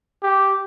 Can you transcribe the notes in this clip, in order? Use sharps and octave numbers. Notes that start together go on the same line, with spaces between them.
G4